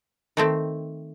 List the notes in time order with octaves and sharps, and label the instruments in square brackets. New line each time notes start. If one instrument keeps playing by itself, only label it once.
[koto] D#3 A3 C4